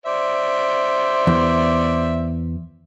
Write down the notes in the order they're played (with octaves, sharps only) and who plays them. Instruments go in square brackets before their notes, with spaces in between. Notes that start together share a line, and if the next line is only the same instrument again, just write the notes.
[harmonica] C5 D5 E5
[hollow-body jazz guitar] E2